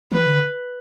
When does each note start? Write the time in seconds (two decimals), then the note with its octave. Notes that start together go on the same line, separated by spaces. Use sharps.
0.12 E3 B4
0.26 D3